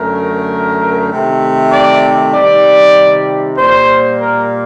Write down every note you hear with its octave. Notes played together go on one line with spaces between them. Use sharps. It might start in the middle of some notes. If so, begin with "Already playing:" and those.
Already playing: F#2 D3 A3 A#4
C3 D#3 A3
D5
C3 D#3 G3 D5
A#2 G3 A#3 C5
A#4